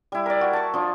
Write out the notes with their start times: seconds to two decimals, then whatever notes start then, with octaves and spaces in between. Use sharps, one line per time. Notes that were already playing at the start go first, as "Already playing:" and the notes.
0.12 G3 E4
0.26 A#4 D5
0.41 F#4
0.53 A5 C#6
0.74 F3 D4